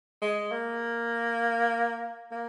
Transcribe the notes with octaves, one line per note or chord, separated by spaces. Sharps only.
G#3
A#3
A#3